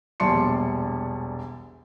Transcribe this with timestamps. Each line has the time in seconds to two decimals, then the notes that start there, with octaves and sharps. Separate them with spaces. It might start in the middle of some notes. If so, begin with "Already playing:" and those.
0.20 E1 A#1 G3 A5 C6 C#7